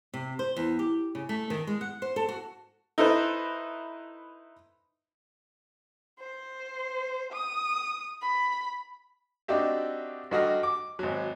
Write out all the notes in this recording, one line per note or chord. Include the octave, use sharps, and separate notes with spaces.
C3
C5
E2
G4
C#3
A3
D#3
G#3
F#5
C5
A4
F#4
D#4 E4 A4 B4 C5
C5
D#6
B5
C4 D4 D#4 F#4 G4 E5
G2 D#4 F#4 A4 D#5 F6
D6
G#1 F#3